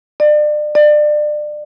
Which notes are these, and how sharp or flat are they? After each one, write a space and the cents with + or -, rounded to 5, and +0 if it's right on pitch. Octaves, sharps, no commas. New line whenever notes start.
D5 +35
D5 +30